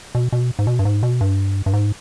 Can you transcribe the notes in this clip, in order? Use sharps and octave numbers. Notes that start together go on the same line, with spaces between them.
B2
B2
G#2
B2
G2
G#2
B2
G2
G2
G#2